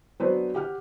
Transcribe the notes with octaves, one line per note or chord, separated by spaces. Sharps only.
F#3 B3 D4 B4 C5
G4 F#5 F6